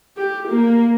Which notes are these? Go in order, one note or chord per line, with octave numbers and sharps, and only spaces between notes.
G4
A#3